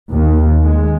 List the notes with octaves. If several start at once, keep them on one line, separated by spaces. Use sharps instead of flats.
D#2
G#3